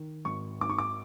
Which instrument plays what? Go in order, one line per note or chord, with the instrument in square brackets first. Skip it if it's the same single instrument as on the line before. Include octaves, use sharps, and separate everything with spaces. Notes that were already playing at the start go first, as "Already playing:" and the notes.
Already playing: [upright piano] D#3
G#1 C#6
G#1 D6
C#6
D6